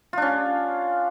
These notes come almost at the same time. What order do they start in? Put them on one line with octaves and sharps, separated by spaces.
F4 D4 C#4